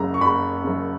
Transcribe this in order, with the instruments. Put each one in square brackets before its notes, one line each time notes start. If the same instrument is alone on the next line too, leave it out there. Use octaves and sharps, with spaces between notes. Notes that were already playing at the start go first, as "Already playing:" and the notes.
Already playing: [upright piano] F#1 F#2 C#3 A#5
C#6
F#1 B5
F#2 C#3